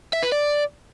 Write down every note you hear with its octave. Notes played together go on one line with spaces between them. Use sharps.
E5
B4
D5